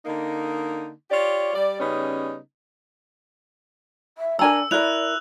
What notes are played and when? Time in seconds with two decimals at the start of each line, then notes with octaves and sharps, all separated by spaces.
0.05 D3 A#3 D#4
1.11 F4 G4 C#5 D5
1.53 G3 D5
1.79 C#3 G3 B3 C#4 D#4
4.17 E5
4.39 D4 A#4 G#5 A#5 E6
4.71 E4 A#4 D5 F#6 F7